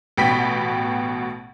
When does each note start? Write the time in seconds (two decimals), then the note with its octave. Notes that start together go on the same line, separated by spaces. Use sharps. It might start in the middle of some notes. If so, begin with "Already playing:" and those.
0.17 A1 B2 G5 B5 B6